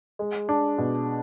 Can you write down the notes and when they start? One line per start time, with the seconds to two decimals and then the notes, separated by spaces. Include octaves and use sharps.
0.19 G#3
0.49 D4
0.78 B2